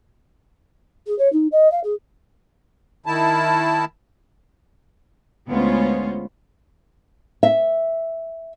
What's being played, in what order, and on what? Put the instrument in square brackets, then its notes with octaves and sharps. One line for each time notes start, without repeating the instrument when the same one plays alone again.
[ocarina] G#4
C#5
D#4
D#5
F5
G#4
[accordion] D#3 E4 A5
[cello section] D2 G#3 B3 C#4 F4 C5
[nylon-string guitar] E5